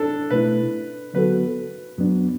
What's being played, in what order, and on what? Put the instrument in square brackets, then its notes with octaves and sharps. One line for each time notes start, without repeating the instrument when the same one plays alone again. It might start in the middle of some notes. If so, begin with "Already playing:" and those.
Already playing: [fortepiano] D4 A4
[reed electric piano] B2 A3 E4 [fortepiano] B4
[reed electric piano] D3 F#3 B3 F#4 A4 [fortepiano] B4
[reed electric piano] F#2 F#3 B3 D4